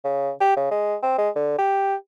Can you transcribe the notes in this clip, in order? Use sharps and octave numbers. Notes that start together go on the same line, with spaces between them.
C#3
G4
C#3
G#3
C4
G#3
D3
G4